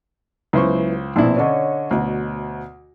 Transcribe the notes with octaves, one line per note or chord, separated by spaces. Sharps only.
C#2 F#3 B3 E4 C5 C#6
A#1 B2 C4 E4
D3 C#4 D4 C#5 D#5
D2 B2